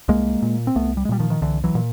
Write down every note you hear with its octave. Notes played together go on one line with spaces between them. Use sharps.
C2 G#3 A#3
A#2
C4
C2 A3 B3
G3
G#3
A#2 F3 G3
D#3 F3
D#3
C2 D3 E3
E3 F#3
A#2